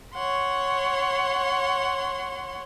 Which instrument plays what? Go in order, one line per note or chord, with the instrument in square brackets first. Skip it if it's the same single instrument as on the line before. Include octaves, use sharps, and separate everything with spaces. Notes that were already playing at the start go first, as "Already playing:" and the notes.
[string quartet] C#5 F#5 C6